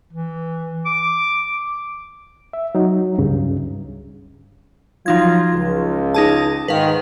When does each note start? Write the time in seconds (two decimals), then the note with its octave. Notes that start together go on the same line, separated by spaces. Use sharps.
0.13 E3
0.86 D6
2.53 E5
2.75 F#3 D#4
3.18 C#2 G2 C#3
5.06 F3 F#3 D#4 F4 G#6
5.53 C#2
6.14 D#4 G#4 A5
6.68 G#2 D#3 B4 F5